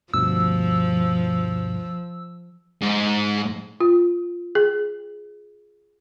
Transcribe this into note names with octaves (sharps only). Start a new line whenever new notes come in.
D2 G2 B2 F3 E6
G#2
F4
G#4